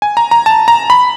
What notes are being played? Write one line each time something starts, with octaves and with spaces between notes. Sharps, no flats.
G#5
A#5
A#5
A5
A#5
B5